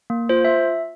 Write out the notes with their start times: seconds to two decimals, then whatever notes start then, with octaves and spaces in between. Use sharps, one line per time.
0.10 A#3
0.29 F4 C5
0.45 E5